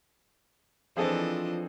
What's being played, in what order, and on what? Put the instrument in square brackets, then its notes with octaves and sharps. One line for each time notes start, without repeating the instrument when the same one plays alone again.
[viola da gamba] E3 D4 D#5 [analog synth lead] F3 [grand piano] C4 G#4 A4